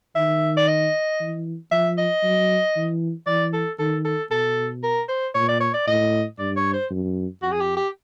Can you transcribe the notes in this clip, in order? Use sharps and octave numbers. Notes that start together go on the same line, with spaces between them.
D#3 E5
D5
D#5
E3
F3 E5
D#5
F#3
E3
E3 D5
A4
D#3 A4
A4
B2 A4
A#4
C5
A#2 C#5
D5
C#5
D5
A2 D#5
G2 D5
C#5
C5
F#2
F2 F#4
G#4
G4
G4